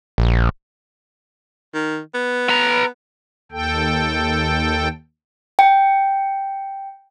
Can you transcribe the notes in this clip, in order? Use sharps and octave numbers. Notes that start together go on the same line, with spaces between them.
A#1
D#3
B3
B4 A#5
D#2 A4 G5
G5